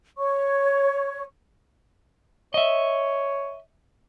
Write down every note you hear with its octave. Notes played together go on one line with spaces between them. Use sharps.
C#5 C#6
C#5 D#5 E5